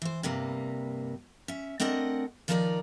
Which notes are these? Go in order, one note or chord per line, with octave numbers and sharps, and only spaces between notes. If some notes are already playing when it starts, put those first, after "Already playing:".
E3 C5
G2 C3 G3 A#3
C#4 E5
A3 C4 D4 A#4 D#5 F#5
D#3 F3 D#4 A#4 B4 D5